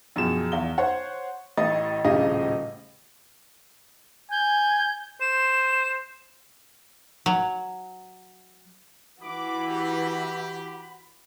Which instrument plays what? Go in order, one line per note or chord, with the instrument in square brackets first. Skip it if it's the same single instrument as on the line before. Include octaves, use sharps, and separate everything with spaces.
[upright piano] F#2 B2 F3 G#4 G5 E7
E2 F5 G7
C5 C#5 F#5
A1 A2 D#5 A6
D#1 A2 C#3 G4 D#5 F5
[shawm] G#5 [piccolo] G6
[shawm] C5 [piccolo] E7
[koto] F#3
[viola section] E3 [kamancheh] F#4 B5 [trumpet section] D6
[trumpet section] G4